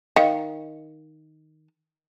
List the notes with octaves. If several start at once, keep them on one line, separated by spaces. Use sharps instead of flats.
D#3 D#5 F5